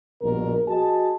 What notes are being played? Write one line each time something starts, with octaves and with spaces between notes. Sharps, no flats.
A#1 G2 B2 A#4
F#4 G#4 D#5 A5